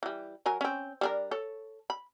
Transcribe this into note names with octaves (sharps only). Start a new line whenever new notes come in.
E3 G3
F#3 A#4 G#5
C4 C#4
G3 D4 A#4
A4 C#5
B5